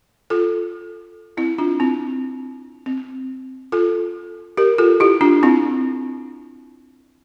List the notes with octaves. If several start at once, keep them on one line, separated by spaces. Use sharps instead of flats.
F4 A4
C4 E4
D4 F4
C4 E4
C4
F4 A4
G4 A#4
F4 A4
E4 G4
D4 F4
C4 E4